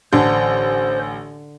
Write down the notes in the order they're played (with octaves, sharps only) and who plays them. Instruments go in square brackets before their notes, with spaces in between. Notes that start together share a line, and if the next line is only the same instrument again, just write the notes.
[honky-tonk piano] A1 [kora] D3 [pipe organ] C5